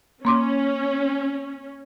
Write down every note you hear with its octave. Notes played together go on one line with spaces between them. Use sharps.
A#3 C#4 C6 D6